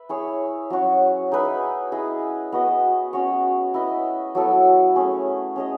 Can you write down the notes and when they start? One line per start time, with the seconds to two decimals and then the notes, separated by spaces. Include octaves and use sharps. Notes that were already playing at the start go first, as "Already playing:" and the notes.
Already playing: B4 E5
0.09 E4 G#4 C#5
0.70 F#3 C#4 F#4
1.32 D#4 G#4 B4 E5
1.92 E4 G#4 D#5
2.52 B3 F#4 B4 D#5
3.13 C#4 F#4 C#5
3.74 E4 B4 D#5
4.35 F#3 B3 E4 A4
4.95 A3 C#4 G#4
5.56 C#4 G#4 D#5